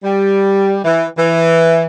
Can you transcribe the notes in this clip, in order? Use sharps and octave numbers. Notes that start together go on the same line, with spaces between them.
G3
E3
E3